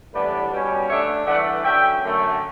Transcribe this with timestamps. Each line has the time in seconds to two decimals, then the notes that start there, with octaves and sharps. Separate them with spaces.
0.12 A2 E3 G3 B3 D4 B4 D5
0.50 B2 G3 C#4
0.88 D3 A3 D4 C#5 E5
1.26 G2 E3 A3 D4 D5 F#5
1.63 D3 F#3 C#4 E5 G5
2.02 F#2 D3 A3